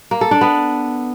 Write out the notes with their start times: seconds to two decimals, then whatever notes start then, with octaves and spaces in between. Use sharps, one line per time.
0.11 A#3
0.21 A4
0.31 D4
0.41 B3